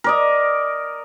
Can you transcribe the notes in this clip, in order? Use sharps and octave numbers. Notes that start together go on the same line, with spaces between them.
A#4 D5 D#5